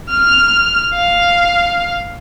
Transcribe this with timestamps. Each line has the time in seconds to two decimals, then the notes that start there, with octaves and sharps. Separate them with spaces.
0.10 F6
0.94 F5